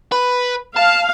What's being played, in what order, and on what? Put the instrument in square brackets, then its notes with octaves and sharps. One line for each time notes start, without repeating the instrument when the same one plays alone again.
[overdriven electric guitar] B4
[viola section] F5 [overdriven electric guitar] A5